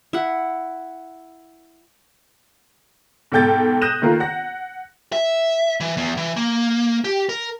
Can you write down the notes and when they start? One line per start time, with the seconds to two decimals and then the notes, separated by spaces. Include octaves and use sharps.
0.13 E4 F#5
3.32 G#2 B2 A4 G5 G6 A6
3.82 D#6 F#6 G6 A#6 D#7 E7
4.02 D#3 A3 A#3 F4 A#4
4.20 F#5 A#6
5.12 E5
5.80 E3
5.97 E2
6.17 E3
6.37 A#3
7.04 G4
7.29 A#4